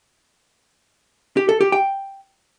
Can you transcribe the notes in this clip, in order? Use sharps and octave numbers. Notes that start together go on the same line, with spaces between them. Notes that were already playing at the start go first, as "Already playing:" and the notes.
G4
A4
G4
G5